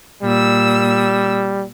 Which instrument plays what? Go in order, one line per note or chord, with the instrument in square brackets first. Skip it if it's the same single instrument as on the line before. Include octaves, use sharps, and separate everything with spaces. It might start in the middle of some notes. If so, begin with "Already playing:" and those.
[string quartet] A#2 E6 [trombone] G3